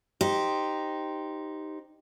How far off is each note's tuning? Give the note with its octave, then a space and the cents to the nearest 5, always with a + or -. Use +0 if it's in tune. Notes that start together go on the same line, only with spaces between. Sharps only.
D#4 +0 G4 +0 C5 +0